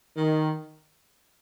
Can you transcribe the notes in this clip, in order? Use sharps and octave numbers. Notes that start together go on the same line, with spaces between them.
D#3